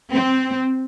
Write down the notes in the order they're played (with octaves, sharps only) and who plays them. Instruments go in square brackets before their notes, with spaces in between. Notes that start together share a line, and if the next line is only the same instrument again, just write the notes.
[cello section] C4